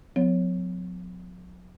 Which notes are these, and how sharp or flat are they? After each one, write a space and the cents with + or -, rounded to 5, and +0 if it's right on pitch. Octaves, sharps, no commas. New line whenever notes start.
F#3 -45 B3 +45 C#5 +0